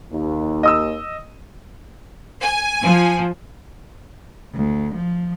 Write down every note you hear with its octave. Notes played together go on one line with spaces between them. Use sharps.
D#2
D#5 D#6 E6
G#5
F3
D2
F3